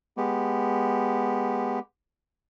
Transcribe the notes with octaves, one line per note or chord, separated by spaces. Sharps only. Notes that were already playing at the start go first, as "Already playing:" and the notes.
G#3 B3 G4